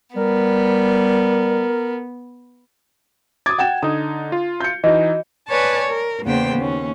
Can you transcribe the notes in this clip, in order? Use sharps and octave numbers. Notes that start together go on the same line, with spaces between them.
G3 B3 A#4
D6 D#6 G#6 A6
F#5 G5 E7
D3 D#4 D#6
F4
G6 C#7
E3 D#4 F#4 D#5
B4 C#5 D5 G#5 A5
A#4
E2 C#3 A#3 B3 C5 G5
D#2 C#4